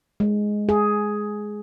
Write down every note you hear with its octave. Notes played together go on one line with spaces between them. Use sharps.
G#3
G#4